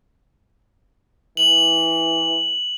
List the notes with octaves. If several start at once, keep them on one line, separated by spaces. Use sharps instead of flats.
E3 F#7